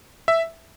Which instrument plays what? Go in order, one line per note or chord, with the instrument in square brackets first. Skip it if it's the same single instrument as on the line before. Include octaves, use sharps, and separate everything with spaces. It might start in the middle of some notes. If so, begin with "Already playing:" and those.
[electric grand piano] E5